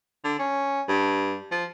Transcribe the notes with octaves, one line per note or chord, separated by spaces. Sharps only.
D3
C#4
G2
F3